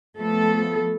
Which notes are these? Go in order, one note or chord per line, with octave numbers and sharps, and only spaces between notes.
F3 A3 B3 A4